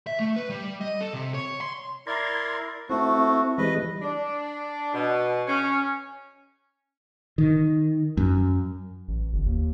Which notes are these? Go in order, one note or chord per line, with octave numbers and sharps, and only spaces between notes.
E5
A3
B4
G3
D#5
A4
C3
C#5
C6
E4 A#4 D5 A#5 C6 G#6
A3 C4 E4 F#4
E3 G3 G#3 B4 D#5
D4
B2
C#4
D#3
F#2
A1
G1
D#2